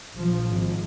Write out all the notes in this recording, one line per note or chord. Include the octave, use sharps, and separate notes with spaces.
A#1 F3
G#1